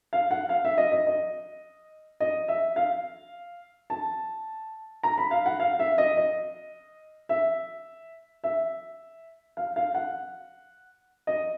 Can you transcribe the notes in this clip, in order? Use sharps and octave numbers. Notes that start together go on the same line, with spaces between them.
F5
F#5
F5
E5
D#5
D#5
D#5
D#5
E5
F5
A5
A#5
B5
F5
F#5
F5
E5
D#5
D#5
E5
E5
F5
F5
F#5
D#5